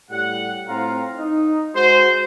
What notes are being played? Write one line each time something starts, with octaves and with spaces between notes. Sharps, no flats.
A2 G3 F#5
A2 C4 F4 F5 A#5
D#4
G#3 F#4 C5